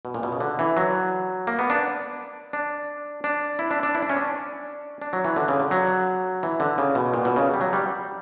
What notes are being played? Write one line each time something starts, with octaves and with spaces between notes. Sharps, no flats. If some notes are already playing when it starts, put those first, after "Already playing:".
B2
A#2
B2
C#3
D3
E3
F#3
A#3
B3
D4
D4
D4
E4
D4
D4
E4
D4
C#4
D4
D4
F#3
E3
D3
C#3
D3
F#3
E3
D3
C#3
B2
A#2
B2
C#3
G3
F#3
G3